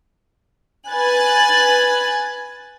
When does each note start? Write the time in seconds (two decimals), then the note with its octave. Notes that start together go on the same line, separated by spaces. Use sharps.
0.89 B4 G#5 F#6 A6